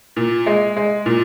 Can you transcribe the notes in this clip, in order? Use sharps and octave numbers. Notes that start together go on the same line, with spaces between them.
A#2
G#3
G#3
A#2